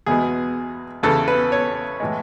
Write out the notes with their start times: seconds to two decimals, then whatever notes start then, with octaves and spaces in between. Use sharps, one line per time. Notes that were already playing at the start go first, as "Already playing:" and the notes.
0.06 E2 B2 G#3 B3 G#4
1.03 E2 C#3 E3 B3 A4
1.28 B4
1.52 C#5
2.00 A2 E3 G#3